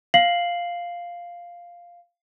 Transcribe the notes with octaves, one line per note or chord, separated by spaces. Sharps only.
F5 C7 F#7